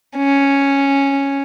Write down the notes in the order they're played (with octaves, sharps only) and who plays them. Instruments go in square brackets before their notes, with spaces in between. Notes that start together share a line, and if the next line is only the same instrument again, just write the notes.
[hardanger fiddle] C#4